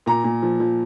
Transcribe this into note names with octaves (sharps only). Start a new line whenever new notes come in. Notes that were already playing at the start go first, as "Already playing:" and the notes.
A#2 A#5
A#2
F3
F3